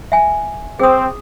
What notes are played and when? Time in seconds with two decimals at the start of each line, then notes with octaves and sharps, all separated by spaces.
0.12 E5 G#5
0.80 C4 G#4 D#6